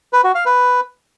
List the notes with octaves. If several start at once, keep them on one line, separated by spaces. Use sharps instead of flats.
B4
F#4
F5
B4